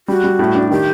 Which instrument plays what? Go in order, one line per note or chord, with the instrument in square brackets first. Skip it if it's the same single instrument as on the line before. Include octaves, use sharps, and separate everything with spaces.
[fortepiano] G3 [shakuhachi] F#4
[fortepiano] G3
A2
D4
[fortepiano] D#3 [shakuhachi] G4